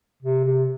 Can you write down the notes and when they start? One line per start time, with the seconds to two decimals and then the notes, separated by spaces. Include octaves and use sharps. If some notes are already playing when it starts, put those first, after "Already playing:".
0.23 C3
0.45 C3